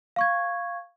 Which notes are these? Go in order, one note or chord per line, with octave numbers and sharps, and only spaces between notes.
F5 C#6 G#6